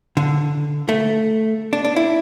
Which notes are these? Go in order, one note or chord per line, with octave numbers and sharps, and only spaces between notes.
D3
A3
D4
D4
E4